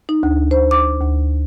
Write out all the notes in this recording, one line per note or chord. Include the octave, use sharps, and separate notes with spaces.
D#4
D2
C5
D6
D2